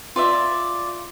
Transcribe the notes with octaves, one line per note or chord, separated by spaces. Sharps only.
F4 D5 E5